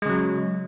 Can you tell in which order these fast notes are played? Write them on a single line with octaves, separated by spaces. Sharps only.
G#3 C#3 F#3